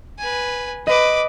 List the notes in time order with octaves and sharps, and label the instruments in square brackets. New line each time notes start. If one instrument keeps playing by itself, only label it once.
[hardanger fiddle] B4 G#5
[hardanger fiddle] B4 D6 [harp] D#5